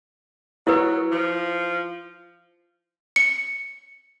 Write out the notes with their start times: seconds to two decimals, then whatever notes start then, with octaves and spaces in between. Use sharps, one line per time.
0.67 F#3 E4 B4
1.12 F3
3.16 C#7